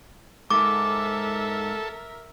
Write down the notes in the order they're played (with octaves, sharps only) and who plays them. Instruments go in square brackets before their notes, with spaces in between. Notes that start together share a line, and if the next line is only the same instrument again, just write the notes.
[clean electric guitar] G#2 G#3 [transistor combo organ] A4 [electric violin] A#4 E5 [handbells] D6